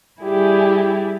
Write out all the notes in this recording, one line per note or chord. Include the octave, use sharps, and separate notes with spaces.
G3 E4 G4 G#4 D5